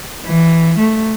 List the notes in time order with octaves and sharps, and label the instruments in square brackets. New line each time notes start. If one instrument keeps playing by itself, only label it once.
[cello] E3
A3